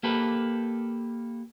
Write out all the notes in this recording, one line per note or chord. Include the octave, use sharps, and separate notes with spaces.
A#3 G4 A4 B4